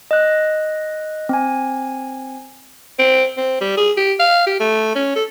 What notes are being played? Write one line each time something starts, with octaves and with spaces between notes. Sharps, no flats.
D#5 F#6
C4 G#5
C4
C4
G3
G#4
G4
F5
G4
A3
C#4
A4